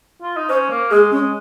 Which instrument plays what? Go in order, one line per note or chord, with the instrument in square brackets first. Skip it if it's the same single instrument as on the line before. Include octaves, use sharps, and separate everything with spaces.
[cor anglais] F4
D#4
[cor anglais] C#4 [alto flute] C5
[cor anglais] A#3
[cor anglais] G#3 [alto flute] G#4
[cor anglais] G#3 [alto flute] C#4